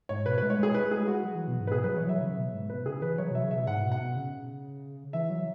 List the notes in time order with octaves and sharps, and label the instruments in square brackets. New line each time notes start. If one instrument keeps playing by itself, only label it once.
[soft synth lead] G#2 [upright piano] C#5
[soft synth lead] B2 [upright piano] B4
[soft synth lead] G#3 [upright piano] B4
[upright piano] C#5
[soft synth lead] G#3 [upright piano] G#4
[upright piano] B4
[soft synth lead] G#3 [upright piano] G#4
[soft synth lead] G#3 [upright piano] F#4
[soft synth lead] F#3
E3
B2
G#2
[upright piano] B4
[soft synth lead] B2 [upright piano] G#4
[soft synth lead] F#3 [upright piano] B4
[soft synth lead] E3 [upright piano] C#5
[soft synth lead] F#3 [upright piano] E5
[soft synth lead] C#3
B2
G#2
[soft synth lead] B2 [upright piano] B4
[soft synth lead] C#3 [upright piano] G#4
[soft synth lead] E3 [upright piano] B4
[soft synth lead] F#3 [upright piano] C#5
[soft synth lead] B2 [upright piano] E5
[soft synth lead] C#3
[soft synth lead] B2 [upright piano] E5
[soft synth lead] G#2 [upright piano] F#5
[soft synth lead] B2
[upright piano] F#5
[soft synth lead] B2
C#3
[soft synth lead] E3 [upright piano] E5
[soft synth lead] F#3